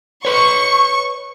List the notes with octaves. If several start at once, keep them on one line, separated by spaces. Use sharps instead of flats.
B4 C#5 C#6